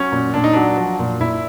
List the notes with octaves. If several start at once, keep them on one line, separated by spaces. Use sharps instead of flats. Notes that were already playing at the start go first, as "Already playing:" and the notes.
Already playing: F#3 C#4
A#2
A#2 D4
D#4
F#3 D4
F3
A#2
A#2 E4